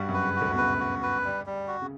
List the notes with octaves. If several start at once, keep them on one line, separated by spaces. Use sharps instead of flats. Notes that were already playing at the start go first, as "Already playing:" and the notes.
Already playing: G2 G3 F#4
F#2 F#3
B4
C#3
F#4
D2 D3
B2
C#3 B4
F#4
B4
G3
G3
F#4
C#3